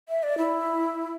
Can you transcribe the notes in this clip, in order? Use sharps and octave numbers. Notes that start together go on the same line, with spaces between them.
E5
D5
E4